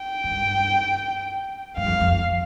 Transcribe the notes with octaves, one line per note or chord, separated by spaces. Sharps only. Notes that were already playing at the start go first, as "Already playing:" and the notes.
Already playing: G5
G2
G2 F5
F2
F2